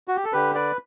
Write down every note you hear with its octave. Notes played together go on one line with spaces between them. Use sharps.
F#4
G4
A4
D3 G4 B4
B4 D5